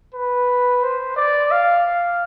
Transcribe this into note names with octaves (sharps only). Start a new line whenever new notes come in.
B4
C5
D5
F5